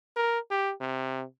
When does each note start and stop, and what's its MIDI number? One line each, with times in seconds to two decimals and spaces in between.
0.16 0.39 70
0.51 0.73 67
0.81 1.24 48